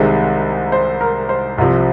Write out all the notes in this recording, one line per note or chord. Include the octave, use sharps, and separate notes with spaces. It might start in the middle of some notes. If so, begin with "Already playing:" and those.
Already playing: C2 C3 D#3 G#3 C5
C5
A#4
C5
C2 C3 F3